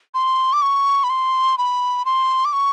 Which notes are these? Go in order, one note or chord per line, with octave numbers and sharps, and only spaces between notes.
C6
D6
C#6
B5
C6
B5
C6
D6
C#6